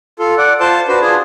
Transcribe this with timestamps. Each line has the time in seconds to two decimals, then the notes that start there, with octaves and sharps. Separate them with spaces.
0.19 F4 A4
0.38 D5 F#5
0.60 F4 C5 A5
0.88 D4 F#4 B4 C5
1.02 D4 F4 G#4